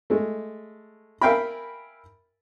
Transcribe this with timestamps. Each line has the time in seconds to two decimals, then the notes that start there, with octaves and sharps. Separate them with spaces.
0.10 G#3 A3
1.21 A#4 E5 F5 G5 G#5 B5